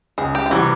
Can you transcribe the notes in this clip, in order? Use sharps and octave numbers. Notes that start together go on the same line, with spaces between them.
C#2 G#4
G4
F4
C3 E3 G3 C4 F#4